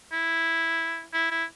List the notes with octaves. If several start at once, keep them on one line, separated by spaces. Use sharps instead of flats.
E4
E4
E4